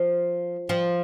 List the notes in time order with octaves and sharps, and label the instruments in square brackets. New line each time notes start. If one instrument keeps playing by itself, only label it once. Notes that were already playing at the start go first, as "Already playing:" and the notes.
Already playing: [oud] F3
F3